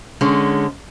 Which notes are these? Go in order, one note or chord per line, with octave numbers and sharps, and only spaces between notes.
D3 G#3 C#4